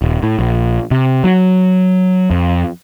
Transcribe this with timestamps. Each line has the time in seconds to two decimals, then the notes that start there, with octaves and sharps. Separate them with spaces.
0.02 D#1
0.23 A2
0.39 A#1
0.91 C3
1.24 F#3
2.31 F2